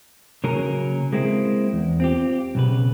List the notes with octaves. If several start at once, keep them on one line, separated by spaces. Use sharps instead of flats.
C#3 F#3 A#3 C#4 A#4
G#3 A#3 C4 E4
E2
C4 F4 G4
B1 C#3 B4